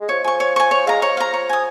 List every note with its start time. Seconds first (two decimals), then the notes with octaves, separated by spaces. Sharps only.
0.01 G#3
0.09 F3 C#5
0.24 F3 G#5 C#6
0.40 C#5
0.56 G#5 C#6
0.71 F3 C#5
0.86 G#3 F5 A#5
1.02 F3 C#5
1.17 F5 A#5
1.34 C#5
1.49 G#5 D#6